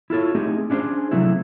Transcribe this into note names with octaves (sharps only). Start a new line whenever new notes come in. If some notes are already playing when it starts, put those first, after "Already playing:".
E4 F4 A4 C#5
A3 C4 D#4 G4 G#4
C#4 D4 E4 G#4 C5
C3 F3 F#3 A3 C4 E4